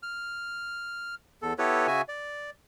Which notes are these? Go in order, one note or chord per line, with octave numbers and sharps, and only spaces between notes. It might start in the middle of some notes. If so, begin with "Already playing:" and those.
F6
E2 A4
B3 E4 G4 A4 B4 C#5
C#3 F#4 E5 G#5
D5